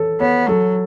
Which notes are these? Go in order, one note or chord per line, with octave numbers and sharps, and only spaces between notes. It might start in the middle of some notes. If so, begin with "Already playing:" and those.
Already playing: E3 A4 C#5
B3 C#5
F#3 A4